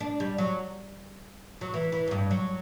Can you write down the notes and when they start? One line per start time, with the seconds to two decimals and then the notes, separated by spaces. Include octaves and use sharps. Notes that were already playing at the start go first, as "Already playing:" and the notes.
0.01 D4
0.20 G3
0.38 F#3
1.61 F#3
1.74 E3
1.92 E3
2.08 F#2
2.11 G2
2.31 F#3